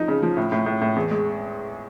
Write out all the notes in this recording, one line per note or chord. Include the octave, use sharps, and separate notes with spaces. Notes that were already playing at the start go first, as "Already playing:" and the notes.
Already playing: F3 D#4
C#3
F3
A2
A2
A2
A2
E2
G#3